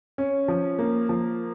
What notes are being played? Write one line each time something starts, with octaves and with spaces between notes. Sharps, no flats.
C#4
F3
A#3
F3